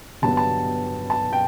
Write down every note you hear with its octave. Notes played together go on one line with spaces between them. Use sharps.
G1 G2 F#3 B3 A5
A5
A5
G5